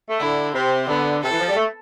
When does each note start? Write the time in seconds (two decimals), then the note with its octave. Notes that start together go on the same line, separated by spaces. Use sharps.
0.09 A3
0.20 D3 E4
0.54 C3 C4
0.88 D3 B3
1.22 C3 A4
1.31 E3
1.40 F3
1.49 G3
1.56 A3